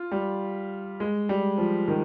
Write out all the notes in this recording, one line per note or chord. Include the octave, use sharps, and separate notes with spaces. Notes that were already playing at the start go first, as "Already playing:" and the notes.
Already playing: F4
G3
G#3
G3
F3
D#3